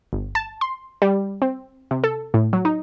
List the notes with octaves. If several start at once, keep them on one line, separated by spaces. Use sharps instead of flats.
G1
A5
C6
G3
C4
C3
A4
A2
F#3
D#4